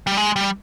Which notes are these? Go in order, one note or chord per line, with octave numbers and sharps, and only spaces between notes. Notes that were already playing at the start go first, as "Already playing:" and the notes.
G3
G#3
G3